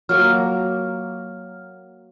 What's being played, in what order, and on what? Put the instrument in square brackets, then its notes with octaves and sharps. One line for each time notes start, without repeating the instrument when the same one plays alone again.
[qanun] F#3 A#3 A#4 [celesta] F6